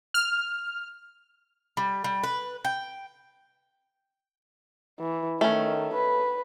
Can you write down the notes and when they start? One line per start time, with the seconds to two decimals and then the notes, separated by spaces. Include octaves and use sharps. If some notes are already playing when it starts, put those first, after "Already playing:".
0.14 F6
1.77 G3
2.04 G3
2.23 B4
2.65 G5
5.00 E3
5.41 D#3 A3 C#4
5.94 B4